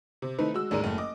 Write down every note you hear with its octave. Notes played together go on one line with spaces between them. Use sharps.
C3
D#3 A3 C4 D#4 E4 B4
G#3 F#4 E6
A1 D#2 G#3 A#4 D5 D#7
F#1 A3
D#5 D6